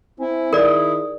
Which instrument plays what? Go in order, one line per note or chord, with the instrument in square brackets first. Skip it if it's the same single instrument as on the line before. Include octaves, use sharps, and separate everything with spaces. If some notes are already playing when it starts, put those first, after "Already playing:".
[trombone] C4 [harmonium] E4 [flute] G#5
[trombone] D#3 [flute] G#4 [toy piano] A#4 D5